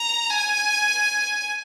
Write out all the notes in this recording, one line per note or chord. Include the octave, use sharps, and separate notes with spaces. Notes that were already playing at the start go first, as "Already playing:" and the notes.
Already playing: A#5
G#5